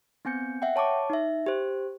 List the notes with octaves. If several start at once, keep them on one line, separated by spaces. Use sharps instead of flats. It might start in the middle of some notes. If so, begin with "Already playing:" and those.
B3 C4 G#5 G6 C#7
E5 F#5 G5
C#5 A5 C#6 D6
D#4 E5
G4 C5